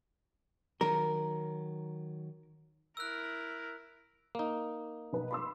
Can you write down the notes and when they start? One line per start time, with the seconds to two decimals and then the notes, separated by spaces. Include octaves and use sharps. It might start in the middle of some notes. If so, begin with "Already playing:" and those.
0.81 D#3 F#3 A#4
2.97 E4 A#4 E6 F#6
4.35 A#3 D#4
5.13 B1 B4
5.31 B5 C6 E6